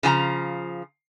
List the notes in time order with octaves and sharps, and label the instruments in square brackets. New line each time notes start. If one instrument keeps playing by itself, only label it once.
[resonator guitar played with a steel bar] C#3 F3 G#5 A#5